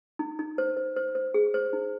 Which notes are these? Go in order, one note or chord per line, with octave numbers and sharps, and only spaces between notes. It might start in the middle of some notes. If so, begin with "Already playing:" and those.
D#4
D#4
C5
C5
C5
C5
G#4
C5
D#4